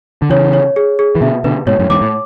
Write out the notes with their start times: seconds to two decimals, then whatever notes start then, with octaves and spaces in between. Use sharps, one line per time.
0.22 D3
0.30 C#3 E3 C#5
0.53 C#5
0.76 G#4
0.99 G#4
1.15 E3
1.21 B2 D3 E5
1.44 B2 D3 B4
1.67 G#2 B2 C#5
1.79 F#2 A2
1.90 E2 G#2 D6
2.01 A2